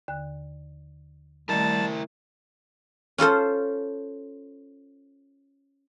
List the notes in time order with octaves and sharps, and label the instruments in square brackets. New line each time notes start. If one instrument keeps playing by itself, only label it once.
[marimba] D#2 D3 F#6
[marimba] D#3 A3 [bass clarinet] G3 [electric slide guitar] E4 A#4 [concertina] A5
[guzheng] C#4 F4 A4 C5